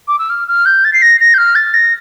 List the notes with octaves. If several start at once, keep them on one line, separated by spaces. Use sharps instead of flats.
D6
E6
F6
F6
G6
A6
C7
A#6
A#6
G6
F6
A6
A#6